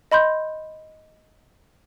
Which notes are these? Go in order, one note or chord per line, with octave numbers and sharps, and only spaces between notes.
D#5 B5 C6 G6